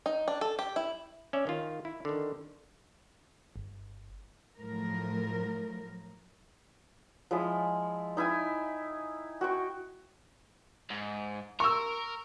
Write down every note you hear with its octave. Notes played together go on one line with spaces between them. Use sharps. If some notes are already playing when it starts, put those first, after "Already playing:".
D#4
D4
A4
G4
E4
C#4 D5 E5
D#3 F4
E4
D3 D#3
G1
A2 F3 F#3 A#4
F3 G#3 E4
D#4 E4 G5 G#5
F#4 G5 C#6
G#2
A#4 C#6 E6